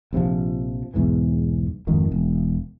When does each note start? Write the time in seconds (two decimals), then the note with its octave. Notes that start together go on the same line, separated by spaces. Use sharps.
0.13 A#1 C3 D#3 F3
0.94 B1 E2 G#2 E3
1.87 G#1 F2 D#3
2.12 E1